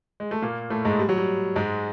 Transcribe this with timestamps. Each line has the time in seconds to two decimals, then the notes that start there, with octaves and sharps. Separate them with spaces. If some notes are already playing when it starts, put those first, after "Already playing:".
0.20 G#3
0.31 A3
0.42 A#2 A#3
0.70 A2 A3
0.85 G#2 G#3
0.99 G3
1.09 F#3
1.18 G3
1.56 G#2 G#3